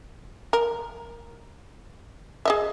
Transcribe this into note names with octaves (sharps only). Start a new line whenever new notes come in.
A#4
G#4 D#5 E5